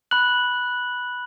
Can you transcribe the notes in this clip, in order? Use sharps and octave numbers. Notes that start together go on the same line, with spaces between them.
B5 F#6 F#7